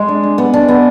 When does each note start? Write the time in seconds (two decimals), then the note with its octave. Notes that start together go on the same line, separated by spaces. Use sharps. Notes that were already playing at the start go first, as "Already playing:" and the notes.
Already playing: G#3
0.08 D4
0.23 D4
0.38 B3
0.54 D4
0.68 B3